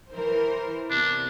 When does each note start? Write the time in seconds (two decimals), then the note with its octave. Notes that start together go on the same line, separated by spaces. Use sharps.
0.12 E3 A#4 C5
0.90 C3 B3 D4